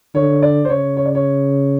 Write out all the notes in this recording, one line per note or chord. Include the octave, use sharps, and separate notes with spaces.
D3 C#5
D5
C5
C#3 C#5
C#5
D5
C#5